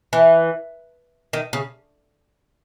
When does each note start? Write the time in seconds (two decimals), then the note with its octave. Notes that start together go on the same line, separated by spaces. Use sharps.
0.13 E3
1.33 D#3
1.53 C#3